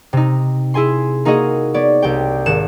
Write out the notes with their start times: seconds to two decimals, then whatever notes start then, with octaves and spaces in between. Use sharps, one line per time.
0.13 C3 D#4
0.74 E4 G#4 G#5 C6
1.25 A#3 D#4 F#4 G#4 D#5 F#5
1.74 B3 C#5 D5
2.02 C2 G4 G5
2.46 G#1 F#6 C#7 E7